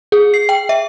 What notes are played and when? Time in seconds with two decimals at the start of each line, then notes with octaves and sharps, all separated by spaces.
0.12 G#4
0.34 C7
0.49 G5
0.69 E5